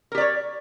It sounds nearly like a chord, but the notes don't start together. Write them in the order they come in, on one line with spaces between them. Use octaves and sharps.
A#4 G4 D5 C#5